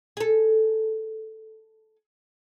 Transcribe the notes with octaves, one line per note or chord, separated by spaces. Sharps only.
G#4 A4